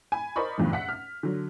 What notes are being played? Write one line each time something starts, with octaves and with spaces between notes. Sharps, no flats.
G#5 B5
A#4 C5 D5 D#5 B5 C#6
F#1 E2 G2 A#2 E3
E5 F#5 B6
F6 B6
D3 F#3